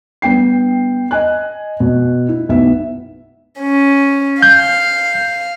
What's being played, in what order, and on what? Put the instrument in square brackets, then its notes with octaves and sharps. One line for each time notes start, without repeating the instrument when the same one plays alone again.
[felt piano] G2 B3 G5 C7
D#5 G#5 F#6
B2
E4
B1 B3 E5
[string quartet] C#4
[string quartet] F5 [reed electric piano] G6